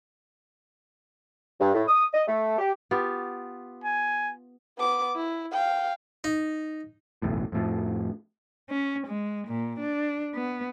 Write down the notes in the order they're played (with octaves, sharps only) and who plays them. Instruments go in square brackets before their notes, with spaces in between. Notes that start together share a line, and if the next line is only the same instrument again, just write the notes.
[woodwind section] G2
A2
D#6
D#5
A3
G4
[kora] B3 F4 G4
[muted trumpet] G#5
[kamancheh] B3 D6
E4
F5 G5
[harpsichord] D#4
[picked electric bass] F#1 B1 E2 A2
F2 A2 F3
[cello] C#4
G#3
A#2
D4
B3